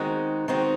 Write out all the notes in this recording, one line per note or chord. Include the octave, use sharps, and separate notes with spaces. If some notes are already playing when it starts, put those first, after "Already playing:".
Already playing: D#3 G#3 C4 D#4 F#4
D#3 G#3 C4 D#4 F#4